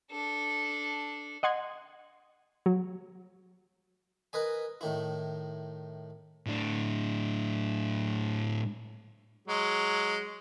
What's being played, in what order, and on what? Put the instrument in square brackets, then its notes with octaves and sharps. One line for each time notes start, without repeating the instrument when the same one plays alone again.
[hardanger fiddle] D4 A4
[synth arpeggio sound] D#5 F#5 C6 G#6
F#3
[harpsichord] A#4 B4 D#5 G#5
A2 D#3 E4
[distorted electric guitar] A2 D4
[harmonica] F#3 G#3